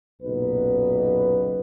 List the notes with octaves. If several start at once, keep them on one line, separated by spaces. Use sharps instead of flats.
F#1 B1 A#2 D#4 F#4 B4